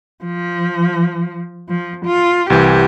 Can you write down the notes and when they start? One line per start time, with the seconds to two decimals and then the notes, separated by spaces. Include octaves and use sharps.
0.24 F3
1.68 F3
2.05 F4
2.50 C2 E3 G4